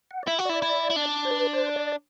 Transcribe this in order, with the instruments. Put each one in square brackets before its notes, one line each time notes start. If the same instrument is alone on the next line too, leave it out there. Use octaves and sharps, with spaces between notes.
[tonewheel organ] F#5
D5
[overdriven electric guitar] E4 [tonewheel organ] E5
[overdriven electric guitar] F#4
[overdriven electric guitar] E4 [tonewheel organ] D5
[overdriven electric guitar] E4
E4
D4
[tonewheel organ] C5
B4
C5
D5